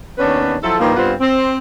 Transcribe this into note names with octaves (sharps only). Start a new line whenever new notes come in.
D#2 B3 C#4 D4 B4 C#5
F3 F#3 E4 A4
G2 D#3 F3 A#3
G2 G3 B3 C4 F4
C4